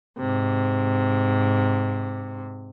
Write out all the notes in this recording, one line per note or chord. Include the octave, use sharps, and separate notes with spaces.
G#2 C3